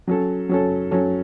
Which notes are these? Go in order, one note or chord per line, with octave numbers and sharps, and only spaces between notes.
F#3 C#4 A4
F#3 C#4 A4
F#3 C#4 A4